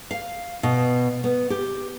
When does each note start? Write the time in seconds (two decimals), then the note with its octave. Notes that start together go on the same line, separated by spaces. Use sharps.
0.11 F5
0.63 B2
1.24 B3
1.50 G4